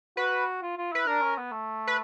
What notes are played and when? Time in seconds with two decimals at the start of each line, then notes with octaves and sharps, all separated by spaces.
0.17 F#4 B4
0.62 F4
0.77 F4
0.92 E4 B4
1.07 D4 A#4
1.22 C#4
1.37 B3
1.52 A3
1.87 B4